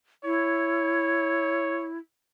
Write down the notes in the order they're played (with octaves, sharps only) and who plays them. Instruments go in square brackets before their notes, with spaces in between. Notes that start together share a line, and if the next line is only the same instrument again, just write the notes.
[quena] E4 [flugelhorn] C#5